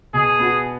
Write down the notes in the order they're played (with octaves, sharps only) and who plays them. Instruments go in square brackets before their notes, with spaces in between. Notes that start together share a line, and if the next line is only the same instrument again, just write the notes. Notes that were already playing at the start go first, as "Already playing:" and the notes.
[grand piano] B2 [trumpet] G#4
[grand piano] B3 F#4